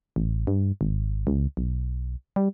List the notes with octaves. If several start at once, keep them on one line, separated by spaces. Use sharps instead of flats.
A1
G2
G#1
C#2
B1
G3